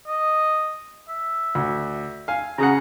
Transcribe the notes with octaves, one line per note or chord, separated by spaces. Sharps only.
D#5
E5
D2
F5 G#5
C#3 G#4 F#5 A#5